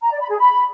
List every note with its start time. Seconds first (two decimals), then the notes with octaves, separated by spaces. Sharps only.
0.02 A#5
0.11 D5
0.20 B5
0.29 G#4
0.38 B5